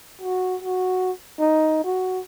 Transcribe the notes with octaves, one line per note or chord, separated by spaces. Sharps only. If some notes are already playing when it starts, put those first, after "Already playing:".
F#4
F#4
D#4
F#4